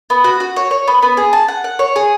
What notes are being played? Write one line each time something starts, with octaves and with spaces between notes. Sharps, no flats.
B3
F#4
F#4
C#5
C#5
B3
B3
G#4
A5
F#5
F#5
C#5
G#4